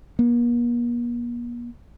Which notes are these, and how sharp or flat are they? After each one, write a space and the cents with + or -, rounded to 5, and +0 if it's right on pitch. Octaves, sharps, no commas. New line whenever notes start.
A#3 +45